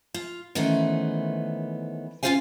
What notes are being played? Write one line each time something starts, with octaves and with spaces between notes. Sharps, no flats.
F4
D#3 E3 A3 B3 C#4 C5
C#4 D#4 F4 C5 F5 G#5